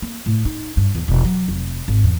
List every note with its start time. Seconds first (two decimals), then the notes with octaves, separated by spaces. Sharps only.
0.02 A#3
0.26 A2
0.45 D#4
0.77 G2
0.95 E2
1.08 E1
1.25 F#3
1.48 F1
1.88 G#1
2.04 E2